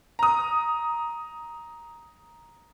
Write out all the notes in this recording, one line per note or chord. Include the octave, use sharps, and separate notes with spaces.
A#5 D#6